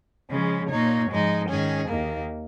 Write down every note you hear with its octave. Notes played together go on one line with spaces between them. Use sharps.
C#3 F3 G#3 C#4
A#2 A#3 D#4 C#5
G#2 F3 G#3 D#4
G#2 D#3 C#4 G#4
D#2 D#3 A#3